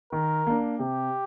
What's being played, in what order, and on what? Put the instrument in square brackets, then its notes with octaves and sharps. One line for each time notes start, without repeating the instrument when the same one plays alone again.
[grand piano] D#3 [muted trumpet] A#4
[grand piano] A#3 D4
[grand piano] C3 [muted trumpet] G4